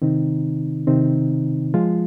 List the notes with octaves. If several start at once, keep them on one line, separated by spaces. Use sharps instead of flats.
C3 D#3 C4 D#4
C3 D#3 C4 D#4
F3 G#3 F4